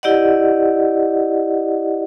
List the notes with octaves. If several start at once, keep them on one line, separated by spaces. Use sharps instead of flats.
E4 G4 D5 D#5 F#5